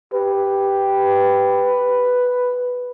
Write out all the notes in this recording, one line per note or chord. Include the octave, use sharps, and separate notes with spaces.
G4 B4